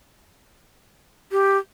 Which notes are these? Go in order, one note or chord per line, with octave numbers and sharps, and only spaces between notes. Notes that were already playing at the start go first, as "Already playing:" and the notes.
G4